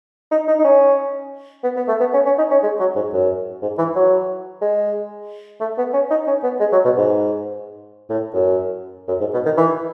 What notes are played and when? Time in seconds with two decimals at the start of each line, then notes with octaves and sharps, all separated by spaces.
0.32 D#4
0.48 D#4
0.59 D#4
0.64 C#4
1.64 B3
1.76 B3
1.88 A3
2.00 B3
2.14 C#4
2.26 C#4
2.38 D#4
2.51 C#4
2.63 G#3
2.80 F#3
2.96 G#2
3.13 F#2
3.62 G#2
3.78 E3
3.96 F#3
4.62 G#3
5.60 A3
5.78 B3
5.93 C#4
6.10 D#4
6.27 C#4
6.44 B3
6.60 G#3
6.72 F#3
6.85 B2
6.97 G#2
8.10 A2
8.33 F#2
9.08 F#2
9.20 G#2
9.33 B2
9.45 D#3
9.57 E3